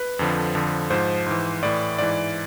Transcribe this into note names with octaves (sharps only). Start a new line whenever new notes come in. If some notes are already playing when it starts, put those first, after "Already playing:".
Already playing: B4
F2 D3 F3
F2 D3 F3
G#2 F3 C5
G#2 E3
A2 E3 D5
G#2 E3 D5